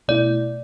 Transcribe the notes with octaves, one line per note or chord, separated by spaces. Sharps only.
B2 A3 E4 D5